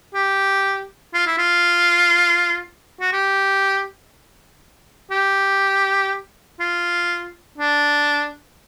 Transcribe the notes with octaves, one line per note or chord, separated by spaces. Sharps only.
G4
F4
E4
F4
F#4
G4
G4
F4
D4